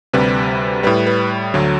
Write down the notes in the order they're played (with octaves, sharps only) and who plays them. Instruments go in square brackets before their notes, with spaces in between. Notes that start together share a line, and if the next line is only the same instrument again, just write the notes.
[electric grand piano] D2 C3 G3 B4
A2 G3 B4
B4
D2 D3 F#3